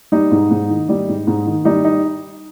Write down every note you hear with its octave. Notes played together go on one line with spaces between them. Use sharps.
G3 D#4
G#2
G#2
D#3
G3
G#2
G#2
D#3
G3 D#4
D#4